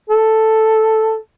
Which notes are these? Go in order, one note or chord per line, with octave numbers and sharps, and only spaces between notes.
A4